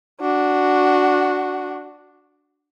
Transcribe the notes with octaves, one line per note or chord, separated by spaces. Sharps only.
D4 F#4